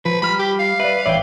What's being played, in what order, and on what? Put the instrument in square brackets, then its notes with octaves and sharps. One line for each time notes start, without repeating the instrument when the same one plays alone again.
[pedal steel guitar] F3 [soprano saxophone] B4
[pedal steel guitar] G3 F6 [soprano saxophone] B5
[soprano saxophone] G4
F5
[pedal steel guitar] B4 [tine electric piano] D5 E5
[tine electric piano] A1 C#5 E5 [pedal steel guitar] D5 G5